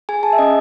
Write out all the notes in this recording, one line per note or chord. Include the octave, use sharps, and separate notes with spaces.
G#4 G#5
G#4 A5
E5
C#4 D#5